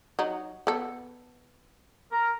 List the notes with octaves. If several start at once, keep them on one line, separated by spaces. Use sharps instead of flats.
F#3 D#4
B3 A4
A#4 A#5